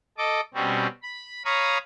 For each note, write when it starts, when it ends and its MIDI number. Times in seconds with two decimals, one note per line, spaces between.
0.18 0.41 69
0.18 0.41 75
0.18 0.41 86
0.54 0.87 47
0.54 0.87 55
0.54 0.87 60
0.54 0.87 61
1.03 1.43 83
1.45 1.78 73
1.45 1.78 77
1.45 1.78 82
1.45 1.78 83
1.45 1.78 85
1.45 1.78 87